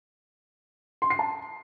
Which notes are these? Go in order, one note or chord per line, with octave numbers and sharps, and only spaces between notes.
C6
C7
A5